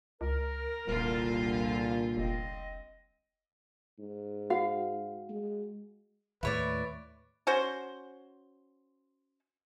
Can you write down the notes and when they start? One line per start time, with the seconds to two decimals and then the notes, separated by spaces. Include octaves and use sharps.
0.21 C#2 A#4
0.88 D#1 C2 A#2 D3 F4
2.17 F1 C4 D#5
3.99 G#2
4.50 F#4 F5 F#5
5.29 G#3
6.43 D#2 A2 A3 E4 B4 C#5 D5
7.47 C#4 F#4 C5